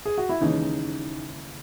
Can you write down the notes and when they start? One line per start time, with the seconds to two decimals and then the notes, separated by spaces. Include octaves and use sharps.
0.06 G#4
0.18 F#4
0.29 E4
0.41 D#2 C#3 E3 G#3 C#4 D#4